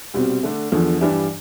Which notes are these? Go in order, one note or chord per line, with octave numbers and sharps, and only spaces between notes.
C2 B2 G3 C4
D3 A3 D4
E2 D3 F3
G2 E3 G3 D4 G4